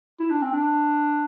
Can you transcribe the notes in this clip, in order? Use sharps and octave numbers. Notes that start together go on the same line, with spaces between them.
E4
D4
C4
D4